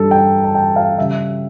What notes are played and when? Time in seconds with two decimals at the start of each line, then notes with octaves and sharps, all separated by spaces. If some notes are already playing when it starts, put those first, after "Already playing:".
Already playing: G2 G3 D4 A4
0.11 G5
0.44 A5
0.55 G5
0.76 F5
0.98 C#3 G3 E5